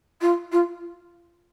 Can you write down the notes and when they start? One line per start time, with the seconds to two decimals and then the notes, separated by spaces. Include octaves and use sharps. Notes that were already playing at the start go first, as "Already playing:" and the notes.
0.21 F4
0.52 F4